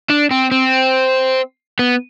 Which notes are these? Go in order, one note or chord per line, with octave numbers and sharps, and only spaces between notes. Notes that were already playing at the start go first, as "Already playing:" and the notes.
D4
C4
C4
B3